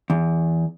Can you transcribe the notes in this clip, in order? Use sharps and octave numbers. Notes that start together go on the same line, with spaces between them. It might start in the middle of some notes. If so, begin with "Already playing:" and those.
E2